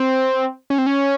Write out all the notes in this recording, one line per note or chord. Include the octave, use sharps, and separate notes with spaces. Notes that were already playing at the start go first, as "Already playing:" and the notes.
Already playing: C4
C#4
C4
C#4